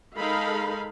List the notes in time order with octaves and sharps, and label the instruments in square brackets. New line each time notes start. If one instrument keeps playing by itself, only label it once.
[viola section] G#3 D#4 A4 A#4 F5 B5